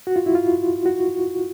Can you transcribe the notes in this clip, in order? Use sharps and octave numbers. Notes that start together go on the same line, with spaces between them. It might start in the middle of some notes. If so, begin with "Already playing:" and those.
F#4
F4
E4
F4
F#4